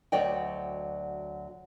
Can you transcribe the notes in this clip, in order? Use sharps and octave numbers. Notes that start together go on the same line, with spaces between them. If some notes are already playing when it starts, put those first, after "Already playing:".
D2 F#3 D5 D#5 G5